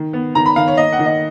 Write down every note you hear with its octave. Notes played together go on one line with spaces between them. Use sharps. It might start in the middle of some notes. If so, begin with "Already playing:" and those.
Already playing: D#3
B3
D#3 A#5
B5
D#3 F5
C#5
A#3 D#5
F#5
D#3
D#5